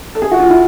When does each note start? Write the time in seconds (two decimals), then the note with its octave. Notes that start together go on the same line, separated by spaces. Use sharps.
0.15 A4
0.22 G#4
0.31 F#4
0.40 F4
0.50 E4